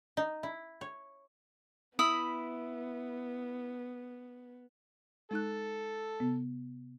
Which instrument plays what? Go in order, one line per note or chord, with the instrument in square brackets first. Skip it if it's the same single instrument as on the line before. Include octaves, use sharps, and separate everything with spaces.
[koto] D#4
E4
C#5
[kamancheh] B3 [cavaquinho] E4 B5 D#6
[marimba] G#3 D#4 F#6 [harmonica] A4
[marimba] C3 B3